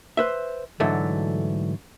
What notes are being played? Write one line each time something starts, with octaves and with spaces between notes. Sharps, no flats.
B4 C5 E5
G#2 D3 E3 F#3 A3